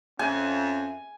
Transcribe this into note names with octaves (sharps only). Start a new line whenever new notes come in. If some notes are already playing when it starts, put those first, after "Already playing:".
F2 C#4 E5 G#5